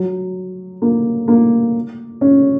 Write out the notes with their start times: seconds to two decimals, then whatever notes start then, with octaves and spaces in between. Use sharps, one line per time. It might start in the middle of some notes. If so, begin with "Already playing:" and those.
Already playing: F#3
0.82 A#3
1.28 A#3
2.21 C#4